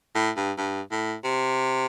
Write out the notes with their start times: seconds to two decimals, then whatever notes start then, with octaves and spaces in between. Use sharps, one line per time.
0.15 A2
0.37 G2
0.58 G2
0.91 A2
1.24 C3